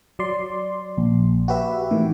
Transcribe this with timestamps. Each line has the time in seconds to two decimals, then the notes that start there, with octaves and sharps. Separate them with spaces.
0.19 F#3 D5 C6
0.98 A#1
1.48 F#4 G4 B4 E5
1.91 A2 D#3 E3